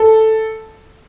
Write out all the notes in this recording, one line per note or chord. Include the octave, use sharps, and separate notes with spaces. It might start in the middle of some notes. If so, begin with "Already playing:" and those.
Already playing: A4